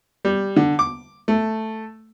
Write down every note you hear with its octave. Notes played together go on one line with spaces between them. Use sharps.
G3
D3
D6
A3